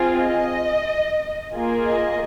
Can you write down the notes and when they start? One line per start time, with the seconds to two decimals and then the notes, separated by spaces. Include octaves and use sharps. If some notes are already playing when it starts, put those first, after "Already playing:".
Already playing: C4 F4 G#4
0.15 D#5
1.53 A#3 F4 G#4
1.85 D#5